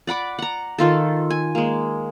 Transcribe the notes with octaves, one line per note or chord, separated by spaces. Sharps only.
D5 F#5 B5 D6
F#5 A#5
D#3 F4 A4
G#5
G#3 A#3